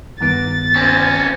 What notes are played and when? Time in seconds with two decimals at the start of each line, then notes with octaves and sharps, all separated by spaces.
0.21 G2 D#3 B3 A6
0.76 C4 C#4